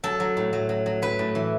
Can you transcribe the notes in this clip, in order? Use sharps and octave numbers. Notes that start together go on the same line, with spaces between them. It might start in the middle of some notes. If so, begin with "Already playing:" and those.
F#3 A4
F#3
A2
F#3
F#3
F#3
F#3 B4
A2
E3